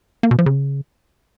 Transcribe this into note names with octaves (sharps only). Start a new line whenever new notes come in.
A#3
B2
F3
C#3